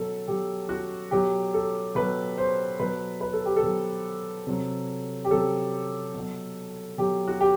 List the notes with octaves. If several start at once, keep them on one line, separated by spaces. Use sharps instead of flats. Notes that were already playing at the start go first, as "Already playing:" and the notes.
Already playing: B2 F#3 A4
B2 F#3 G4
F#4
B2 F#3 G4
A4
B2 F#3 B4
C5
B2 F#3 B4
B4
A4
G4
A4
B2 F#3
C3 F#3
G4
C3 F#3 A4
B2
F#3
B2 F#3 G4
F#4
G4